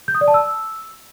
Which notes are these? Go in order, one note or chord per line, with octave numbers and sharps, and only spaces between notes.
G6
D#6
D5
A5
E6